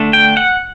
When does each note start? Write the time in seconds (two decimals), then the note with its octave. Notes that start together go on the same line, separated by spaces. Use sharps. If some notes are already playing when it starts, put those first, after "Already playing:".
Already playing: D3 A3 D4
0.13 G5
0.37 F#5